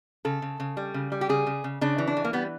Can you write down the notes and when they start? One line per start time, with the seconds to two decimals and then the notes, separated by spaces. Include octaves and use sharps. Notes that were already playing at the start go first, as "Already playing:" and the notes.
0.25 C#3 A4
0.42 C#3
0.60 C#3
0.77 G3
0.94 C#3
1.12 G3
1.21 G4
1.29 C#3 G#4
1.47 C#3
1.64 C#3
1.81 C#3 D4
1.98 E3
2.07 D4
2.17 E3
2.24 A#3
2.33 G3 B3